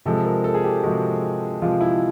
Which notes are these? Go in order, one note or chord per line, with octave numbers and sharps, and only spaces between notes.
C3 F3 G#3 A4
A#4
A4
G#4
G4
C3 F3 G#3 F#4
C3 F3 G#3 F4
E4